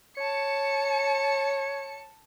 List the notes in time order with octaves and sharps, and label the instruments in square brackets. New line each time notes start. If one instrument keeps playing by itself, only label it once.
[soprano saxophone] C#5 [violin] A5 C#7